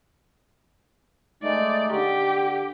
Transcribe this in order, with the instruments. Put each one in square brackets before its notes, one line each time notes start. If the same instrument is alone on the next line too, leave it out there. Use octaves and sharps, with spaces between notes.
[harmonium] G#3 A3 D#4 [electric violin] D5
[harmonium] D3 [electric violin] G4